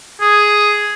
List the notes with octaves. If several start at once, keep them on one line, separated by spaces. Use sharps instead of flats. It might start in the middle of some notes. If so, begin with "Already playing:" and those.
G#4